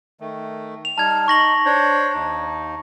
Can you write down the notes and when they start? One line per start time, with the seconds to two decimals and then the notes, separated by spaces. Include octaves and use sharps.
0.20 D#3 A3
0.85 F7
0.98 G3 D#4 A5 F6 G#6
1.28 D#4 C#6 A#6 F#7
1.65 D4 C5 C#5
2.14 D#2 D#4